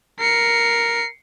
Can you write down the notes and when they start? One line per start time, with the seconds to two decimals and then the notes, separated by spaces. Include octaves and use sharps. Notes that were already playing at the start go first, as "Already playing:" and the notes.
0.20 A#4 C7 C#7